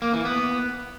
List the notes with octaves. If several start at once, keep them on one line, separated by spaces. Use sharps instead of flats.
A#3
E3
B3